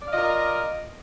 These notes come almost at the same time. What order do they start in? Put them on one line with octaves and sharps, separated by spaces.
D5 F5 D#5 F4 A#4